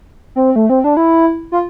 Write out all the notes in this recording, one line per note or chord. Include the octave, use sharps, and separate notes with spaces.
C4
A3
C4
D4
E4
F4